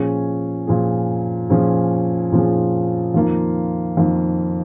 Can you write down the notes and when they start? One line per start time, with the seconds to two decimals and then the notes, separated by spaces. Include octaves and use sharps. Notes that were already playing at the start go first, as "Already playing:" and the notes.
Already playing: A#2 F3 C#4 G#4
0.67 A#2 F3 C#4 G#4
1.50 A#2 F3 C#4 G#4
2.32 A#2 F3 C#4 G#4
3.14 F2 D#3 A#3 F4
3.97 F2 D#3 A#3 F4